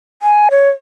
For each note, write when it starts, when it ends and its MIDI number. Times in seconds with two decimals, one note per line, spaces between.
0.22 0.49 80
0.51 0.70 73